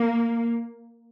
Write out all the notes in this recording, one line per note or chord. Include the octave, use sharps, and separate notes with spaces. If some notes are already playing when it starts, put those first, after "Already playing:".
Already playing: A#3